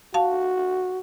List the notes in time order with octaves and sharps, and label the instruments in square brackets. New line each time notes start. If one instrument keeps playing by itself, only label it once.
[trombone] F#4 [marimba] F5 A5